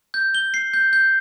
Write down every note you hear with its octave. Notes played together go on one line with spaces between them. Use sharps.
G6
G7
C7
G6
G6